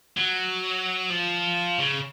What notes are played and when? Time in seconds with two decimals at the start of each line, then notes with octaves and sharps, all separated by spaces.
0.17 F#3
1.10 F3
1.79 C#3